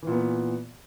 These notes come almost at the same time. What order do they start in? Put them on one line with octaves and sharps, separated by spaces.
E3 A#2 B3